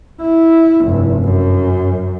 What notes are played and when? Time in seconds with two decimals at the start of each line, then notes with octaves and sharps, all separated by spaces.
0.21 E4
0.84 F1 G2
1.24 F#2